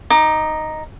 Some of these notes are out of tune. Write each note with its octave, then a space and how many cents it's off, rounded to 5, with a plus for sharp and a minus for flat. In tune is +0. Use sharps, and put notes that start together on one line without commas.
D#4 +0 D6 +30